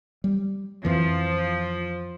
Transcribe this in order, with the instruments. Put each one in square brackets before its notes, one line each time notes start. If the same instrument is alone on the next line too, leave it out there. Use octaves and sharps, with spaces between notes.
[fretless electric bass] G3
[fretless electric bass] F2 E3 [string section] F3